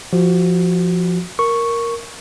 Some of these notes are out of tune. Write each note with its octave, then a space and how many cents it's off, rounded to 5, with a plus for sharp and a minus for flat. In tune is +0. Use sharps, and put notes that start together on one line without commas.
F3 +0 F#4 +15
A#4 +0 C#6 +0